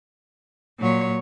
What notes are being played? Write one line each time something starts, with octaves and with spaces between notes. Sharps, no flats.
A#2 F#3 C#5